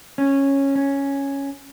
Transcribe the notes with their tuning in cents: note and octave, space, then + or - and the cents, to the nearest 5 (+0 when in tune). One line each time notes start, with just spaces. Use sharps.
C#4 -10
C#4 +0